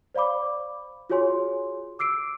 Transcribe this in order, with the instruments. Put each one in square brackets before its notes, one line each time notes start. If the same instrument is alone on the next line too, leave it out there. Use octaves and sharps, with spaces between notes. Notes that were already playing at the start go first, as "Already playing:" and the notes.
[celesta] C5 D5 F5 B5 D6
F4 F#4 G#4 C#5 G#5 C6
D6 E6 C7 D7